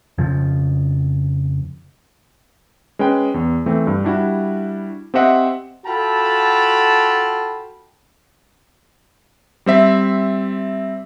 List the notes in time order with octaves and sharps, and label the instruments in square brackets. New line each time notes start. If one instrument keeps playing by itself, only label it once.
[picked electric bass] F2 C#3 F3
[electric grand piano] G#3 C#4 B4 G5
E2
E3 A3 C4
G2
G3 D4 E4 F#4
C4 G4 C5 D#5 E5 F#5
[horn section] F4 F#4 A4 G5 A5 B5
[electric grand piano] G3 C4 E5